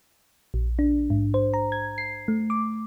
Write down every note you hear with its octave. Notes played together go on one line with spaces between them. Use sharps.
A#1
D4
G#2
C5
A#5
G#6
C7
A3
D6